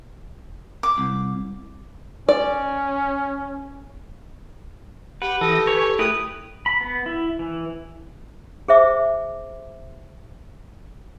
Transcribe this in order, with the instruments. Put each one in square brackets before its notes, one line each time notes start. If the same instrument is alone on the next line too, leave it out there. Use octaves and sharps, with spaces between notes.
[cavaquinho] D6
[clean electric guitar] C2
[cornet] C#4 [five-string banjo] D5
[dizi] G4 [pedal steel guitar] B4 [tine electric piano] F#5
[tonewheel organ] E3 D#6 A#6 [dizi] G4 [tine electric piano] A4
[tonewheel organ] B4 G#5 C#6 [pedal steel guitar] C#5
[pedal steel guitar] A3 G4 B4 [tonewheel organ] E4 G#4 A#4 [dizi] D#6
[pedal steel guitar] B5
B3
E4
E3
[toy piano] G#4 C5 E5 D6